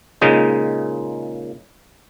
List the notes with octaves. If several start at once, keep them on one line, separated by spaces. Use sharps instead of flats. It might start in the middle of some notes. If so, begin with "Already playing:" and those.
A#2 C#3 G#3 D#4